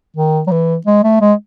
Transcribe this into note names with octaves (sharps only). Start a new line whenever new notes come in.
D#3
F#3
E3
G#3
A3
G#3